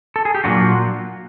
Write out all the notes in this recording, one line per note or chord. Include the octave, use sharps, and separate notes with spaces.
A4
G#4
G4
A#2 F#3 A#3 D4 F4 F#4